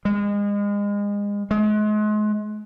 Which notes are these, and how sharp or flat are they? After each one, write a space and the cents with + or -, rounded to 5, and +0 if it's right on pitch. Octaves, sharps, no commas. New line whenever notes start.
G#3 -30
G#3 +35